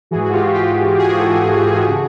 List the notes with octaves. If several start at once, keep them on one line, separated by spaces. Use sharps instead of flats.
G#2 E3 F#4 G#4
F#4
F4 G4
F4 G4
F#4 G#4
G4 A4
C#3 E3 F#4 G#4